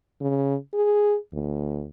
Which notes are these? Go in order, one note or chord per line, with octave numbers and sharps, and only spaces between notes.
C#3
G#4
D2